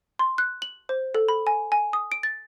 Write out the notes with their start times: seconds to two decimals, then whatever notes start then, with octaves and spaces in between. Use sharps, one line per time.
0.19 C6
0.38 F#6
0.62 F#7
0.89 C5
1.15 A4
1.28 B5
1.47 G#5
1.72 G#5
1.93 D#6
2.12 D7
2.23 A6